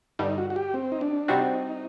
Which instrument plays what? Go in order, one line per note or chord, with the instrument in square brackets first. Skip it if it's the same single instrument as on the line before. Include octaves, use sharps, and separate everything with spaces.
[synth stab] G2 D3 G3 [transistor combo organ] D#4
[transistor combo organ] F#4
F#4
G4
C4
D#4
D4
[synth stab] C3 G3 C4 F#4 [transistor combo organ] D#4